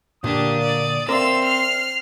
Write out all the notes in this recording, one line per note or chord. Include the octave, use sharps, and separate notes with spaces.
A#2 D3 A#3 D4 G4 D#6
D5
C4 A#4 D5 E5 F5 C6 E6
F6 C7